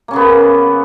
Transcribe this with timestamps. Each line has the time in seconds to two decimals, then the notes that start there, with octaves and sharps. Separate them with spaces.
0.08 A#3
0.11 C#4
0.13 C#3
0.16 B3